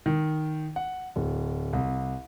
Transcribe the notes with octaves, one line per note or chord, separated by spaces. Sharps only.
D#3
F#5
D1
C2